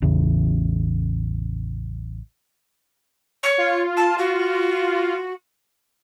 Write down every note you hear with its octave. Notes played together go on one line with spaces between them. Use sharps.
A1 E2 C#3
C#5
F4
A5
F#4